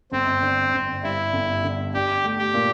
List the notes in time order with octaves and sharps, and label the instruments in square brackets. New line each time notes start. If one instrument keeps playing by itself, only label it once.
[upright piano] G1 [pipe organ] C4
[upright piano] D3
G1
[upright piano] G2 [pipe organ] E4
[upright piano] G1
D3
[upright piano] D4 [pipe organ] G4
[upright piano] A3
[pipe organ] G4
[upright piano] A#2